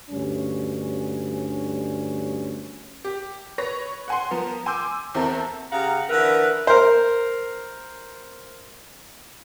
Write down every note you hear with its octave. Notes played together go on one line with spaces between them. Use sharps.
D2 G2 C#4
G4
B4 C#5 A#6
F#5 G#5 C6
F3 B3 A#4
G#5 C6 D6 E6 G6
E2 C4 E4 A4 A#4
C#3 G4 F5 F#5 A#5
D3 E3 A#4 B4 E5
A#4 C5